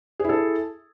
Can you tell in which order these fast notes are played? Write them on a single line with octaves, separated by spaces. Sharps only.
G#4 E4 A4